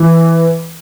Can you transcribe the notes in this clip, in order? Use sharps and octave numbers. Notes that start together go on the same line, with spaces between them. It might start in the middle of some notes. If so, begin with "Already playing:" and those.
Already playing: E3